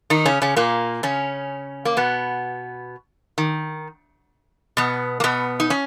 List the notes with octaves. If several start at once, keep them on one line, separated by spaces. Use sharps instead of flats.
D#3 D#4
C#3 C#4
C#3 C#4
A#2 A#3
C#3 C#4
A#3
B2 B3
D#3
B2 B3
A#3
B2 B3
D#4
C#4